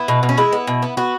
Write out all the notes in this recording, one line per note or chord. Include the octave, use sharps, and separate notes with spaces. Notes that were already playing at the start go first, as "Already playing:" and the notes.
Already playing: B3 E4
B2
B2
C#4
G#3 E4
B3
B2
B3
B3 F#4